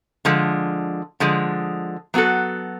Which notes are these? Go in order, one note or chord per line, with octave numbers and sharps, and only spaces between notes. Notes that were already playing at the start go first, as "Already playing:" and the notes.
D3 F3 G#3
D3 F3 G#3
F#3 B3 F#4 A4